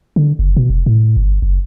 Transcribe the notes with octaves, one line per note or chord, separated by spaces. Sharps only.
D3
F#1
B2
F1
A2
G1
F#1